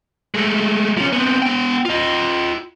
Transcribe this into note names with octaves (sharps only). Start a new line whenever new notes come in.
G#3 A3
F3 C#4
B3 C4
B3 G5
F4 D#5